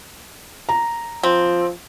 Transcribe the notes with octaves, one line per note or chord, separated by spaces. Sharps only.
A#5
F3 C4